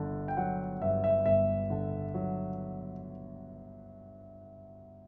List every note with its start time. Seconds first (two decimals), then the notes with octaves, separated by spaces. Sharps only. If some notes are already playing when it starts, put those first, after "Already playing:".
Already playing: G1 D3
0.28 G5
0.37 F#3 F#5
0.82 G2 E5
1.04 E5
1.25 G1 E5
1.70 D3
2.14 F#3